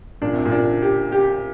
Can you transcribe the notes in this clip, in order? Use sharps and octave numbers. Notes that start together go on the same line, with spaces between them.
A#2 D4
C3
A#2
D4
G4
G4